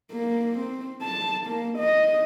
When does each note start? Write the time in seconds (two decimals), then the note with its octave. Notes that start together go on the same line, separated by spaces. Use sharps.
0.12 A#3
0.58 C4
1.02 A5
1.47 A#3
1.78 D#5